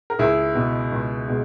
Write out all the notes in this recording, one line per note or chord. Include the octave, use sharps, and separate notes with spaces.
A#4
C#2 E4 G#4
B2 G#3
C#2
B2 G#3